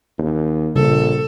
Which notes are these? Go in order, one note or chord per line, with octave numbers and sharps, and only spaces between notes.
D#2
A#1 C#3 F3 G3 A4